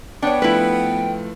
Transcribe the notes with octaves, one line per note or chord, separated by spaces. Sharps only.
B3 D4 C#5 G5
F3 A3 E4 B4